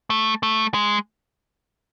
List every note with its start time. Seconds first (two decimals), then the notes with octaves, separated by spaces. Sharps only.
0.10 A3
0.43 A3
0.74 G#3